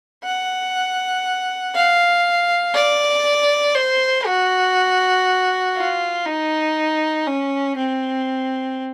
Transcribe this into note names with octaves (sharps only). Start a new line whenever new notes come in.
F#5
F5
D5
C5
F#4
F4
D#4
C#4
C4